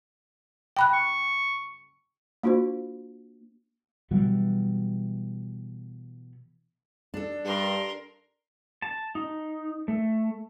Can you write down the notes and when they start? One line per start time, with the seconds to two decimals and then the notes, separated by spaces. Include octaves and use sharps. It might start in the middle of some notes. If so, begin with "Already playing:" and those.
0.77 G5 B5 F#6
0.93 C#6
2.43 A#3 D4 F4 F#4 C5
4.11 B2 E3 F#3 G3
7.14 D4 A4
7.45 G2 A#4 C6
8.82 A5
9.15 D#4
9.88 A3